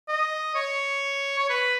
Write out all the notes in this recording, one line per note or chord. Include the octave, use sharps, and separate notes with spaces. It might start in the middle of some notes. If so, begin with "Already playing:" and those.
D#5
C#5
C#5
B4